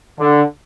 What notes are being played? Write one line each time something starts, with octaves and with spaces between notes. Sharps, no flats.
D3